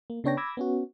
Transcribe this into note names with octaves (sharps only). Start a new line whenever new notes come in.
A#3
C#3 B3 D4 C#5 G5 A#6
B5 D6 E6 G#6 A#6
B3 C#4 F#4